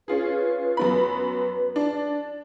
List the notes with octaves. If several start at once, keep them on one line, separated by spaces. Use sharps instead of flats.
C#4 F4 G#4 B4
F#2 B3 B5
D4